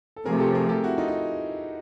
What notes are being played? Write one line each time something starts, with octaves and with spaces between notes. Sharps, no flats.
A4
C3 F3 A3 G#4 A#4
G4 A4
G#4 A#4
G4 A4
E4 F#4
D#4 F4
D#4